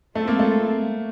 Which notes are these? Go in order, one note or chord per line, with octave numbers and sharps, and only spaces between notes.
G#3 A3 C4 F4 A4
A#3
A3